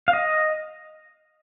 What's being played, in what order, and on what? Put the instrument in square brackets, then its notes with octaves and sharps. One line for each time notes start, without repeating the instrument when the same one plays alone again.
[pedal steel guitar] F5
D#5